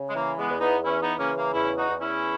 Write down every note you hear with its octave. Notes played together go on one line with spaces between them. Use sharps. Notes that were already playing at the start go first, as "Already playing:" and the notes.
Already playing: C#3
G#3
E3 A#3
G#3 B3
E2
B3 D#4
E3 C#4 E4
B3 D#4
C#3 A#3 C#4
A#3
E2 C#4 E4
D#4 F#4
E2
C#4 E4